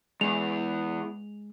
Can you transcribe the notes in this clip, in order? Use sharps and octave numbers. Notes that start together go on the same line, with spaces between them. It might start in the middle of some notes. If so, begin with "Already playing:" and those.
E2 G#3 F7